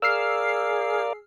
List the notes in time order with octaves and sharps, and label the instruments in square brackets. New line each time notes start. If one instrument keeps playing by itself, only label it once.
[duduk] G#4 [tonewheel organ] A#4 D5 F5 [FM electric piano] E6 F6 C7